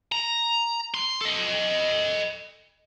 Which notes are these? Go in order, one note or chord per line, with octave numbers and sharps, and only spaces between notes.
A#5
C6
A4 D#5